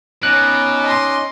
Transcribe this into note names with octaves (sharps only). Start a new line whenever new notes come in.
B2 C#4 D#4 D6 F#6
D#5 C6